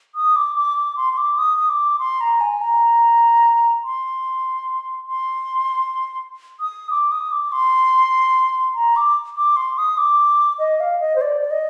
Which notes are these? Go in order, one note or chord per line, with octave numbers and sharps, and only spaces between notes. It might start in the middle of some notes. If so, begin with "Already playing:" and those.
D#6
D6
D6
D6
C6
C6
D6
D#6
D#6
D6
C6
A#5
G#5
A#5
C6
C6
D#6
D6
D#6
D6
C6
A#5
D6
D6
C6
D#6
D6
D#5
F5
D#5
C5
D5
D5
D#5